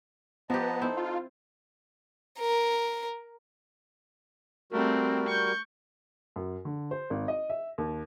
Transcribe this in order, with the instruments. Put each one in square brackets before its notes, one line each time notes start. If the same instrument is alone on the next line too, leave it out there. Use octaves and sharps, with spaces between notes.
[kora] F3 G4 [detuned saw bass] B3 [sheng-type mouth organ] D#5 A5 A#5
[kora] C4 E4 C5 [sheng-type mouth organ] D#4 A4
[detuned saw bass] F4
[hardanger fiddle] A#4
[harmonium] G3 F#4 A#4 [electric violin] A3 C4
[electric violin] C#6 G6
[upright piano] F#2
D3
C5
G#1
D#5
E5
D#2